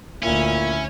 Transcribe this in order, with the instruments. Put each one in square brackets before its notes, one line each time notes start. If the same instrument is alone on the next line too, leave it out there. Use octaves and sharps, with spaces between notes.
[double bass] D2 [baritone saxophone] A#2 [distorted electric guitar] C#4 [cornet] E4